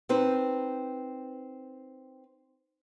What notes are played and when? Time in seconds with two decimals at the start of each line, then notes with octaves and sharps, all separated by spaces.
0.09 C4 D#4 B4 C5